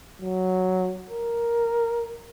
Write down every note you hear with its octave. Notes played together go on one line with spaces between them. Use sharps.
F#3
A#4